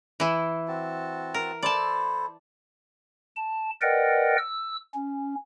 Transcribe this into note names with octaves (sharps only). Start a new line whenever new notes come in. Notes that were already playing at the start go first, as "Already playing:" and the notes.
E3 E4
C4 F#4 A5
A#4
E4 A4 C5 D5 A5
A5
A#4 B4 D5 D#5 F#5 G5
E6
C#4